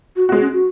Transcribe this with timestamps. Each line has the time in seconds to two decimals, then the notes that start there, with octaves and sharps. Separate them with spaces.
0.16 F#4
0.29 G#3 F#4
0.41 C#4
0.53 F#4